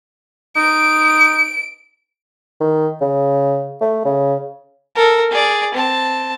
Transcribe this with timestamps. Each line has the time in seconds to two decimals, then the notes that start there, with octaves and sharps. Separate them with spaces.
0.56 D#4 D7
2.60 D#3
3.01 C#3
3.81 A3
4.05 C#3
4.96 A4 A#4
5.31 G#4 D5
5.74 C4 A5